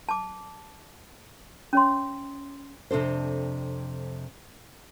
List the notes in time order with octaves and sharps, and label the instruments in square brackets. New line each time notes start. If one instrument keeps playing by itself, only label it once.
[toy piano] A5 D6
C#4 C#5 C6
[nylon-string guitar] F2 C3 D4 A4 C5